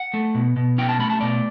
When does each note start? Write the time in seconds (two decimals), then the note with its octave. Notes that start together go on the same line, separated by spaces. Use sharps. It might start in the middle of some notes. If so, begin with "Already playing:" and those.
Already playing: F#5
0.14 A3
0.35 B2
0.56 B2
0.78 C#4 G5
0.89 A5
0.99 A3 B5
1.10 A5
1.21 B2 D5